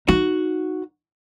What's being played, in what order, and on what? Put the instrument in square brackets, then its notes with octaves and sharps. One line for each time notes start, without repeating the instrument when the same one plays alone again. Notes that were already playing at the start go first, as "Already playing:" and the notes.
[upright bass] D#4 [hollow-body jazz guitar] F#4